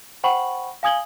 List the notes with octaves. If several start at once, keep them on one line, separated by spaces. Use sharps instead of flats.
C5 F#5 G5 B5 C#6 F#7
F5 G#5 D#6 G#6 F#7 G7